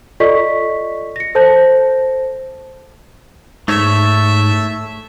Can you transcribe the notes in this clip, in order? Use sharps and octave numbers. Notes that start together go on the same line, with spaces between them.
F4 A4 D5 D#5 C#6 B6
A#6 C#7
A4 C5 A5 G6 A#6
G#2 A3 C#5 E5